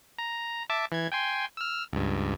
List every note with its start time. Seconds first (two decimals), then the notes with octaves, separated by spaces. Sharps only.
0.18 A#5
0.70 E5 A5 D6
0.92 E3 G#6
1.12 G5 G#5 C6
1.57 E6 F6
1.93 C#2 G2